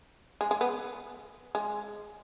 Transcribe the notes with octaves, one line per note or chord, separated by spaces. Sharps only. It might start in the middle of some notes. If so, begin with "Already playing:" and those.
G#3
G#3
B3
G#3